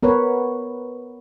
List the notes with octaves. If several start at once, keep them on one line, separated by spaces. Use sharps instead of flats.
B3 A#4 B4 C#5